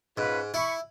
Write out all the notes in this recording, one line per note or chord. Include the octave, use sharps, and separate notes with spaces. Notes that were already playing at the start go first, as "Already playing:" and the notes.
G#2 C#4 F4 B4
E4 B5 C#6